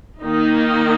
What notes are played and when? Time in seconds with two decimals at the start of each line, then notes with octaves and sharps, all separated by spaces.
0.20 D#3 A#3 D#4